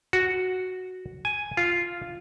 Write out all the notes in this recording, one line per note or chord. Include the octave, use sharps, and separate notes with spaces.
F#4
G#5
F4